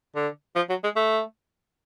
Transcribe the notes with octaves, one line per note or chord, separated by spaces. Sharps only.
D3
F3
F#3
G#3
A3